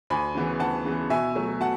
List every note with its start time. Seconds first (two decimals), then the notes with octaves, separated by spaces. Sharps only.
0.10 D2 G#5 B5
0.35 C#3 E3 B3
0.60 D2 F#5 A5
0.85 C#3 E3 B3
1.10 B2 E5 G#5
1.35 F#3 A3
1.61 B2 F#5 A5